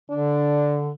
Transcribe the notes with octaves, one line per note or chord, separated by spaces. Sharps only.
D3 D4